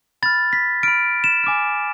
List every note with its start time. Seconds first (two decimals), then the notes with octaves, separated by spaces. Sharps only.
0.22 B5 F6 A6
0.53 B6
0.83 F6 D7
0.88 B5
1.24 E7
1.44 G#5 D6 F6